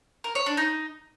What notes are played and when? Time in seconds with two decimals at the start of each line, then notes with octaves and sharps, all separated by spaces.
0.24 A#4
0.35 C#5
0.46 D4
0.57 D#4